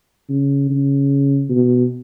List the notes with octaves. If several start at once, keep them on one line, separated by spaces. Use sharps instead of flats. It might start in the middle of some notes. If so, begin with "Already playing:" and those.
C#3
C#3
B2